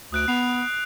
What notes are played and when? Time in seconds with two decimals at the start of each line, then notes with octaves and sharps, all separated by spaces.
0.12 D2 D#6 F#6 D7
0.28 B3 C7 F7
0.63 C7